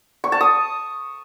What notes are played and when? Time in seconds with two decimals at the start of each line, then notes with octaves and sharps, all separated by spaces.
0.24 C#6
0.32 A5
0.41 D#6